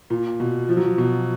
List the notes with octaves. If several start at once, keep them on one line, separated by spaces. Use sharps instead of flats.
A#2
B2
F3
F#3
F3
B2